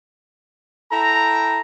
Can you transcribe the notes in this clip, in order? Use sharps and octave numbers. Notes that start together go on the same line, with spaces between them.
E4 A4 G5 A#5